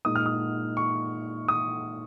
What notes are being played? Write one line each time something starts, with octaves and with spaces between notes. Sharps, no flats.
A#2 G#3 D#4 D#6
F6
D#6
C#6
D#6